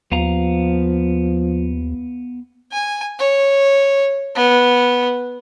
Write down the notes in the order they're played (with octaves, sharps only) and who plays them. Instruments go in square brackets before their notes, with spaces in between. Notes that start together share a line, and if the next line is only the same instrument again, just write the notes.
[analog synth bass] D#2 [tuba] F3 [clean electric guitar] B3 F5 A#5
[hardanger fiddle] G#5
C#5
B3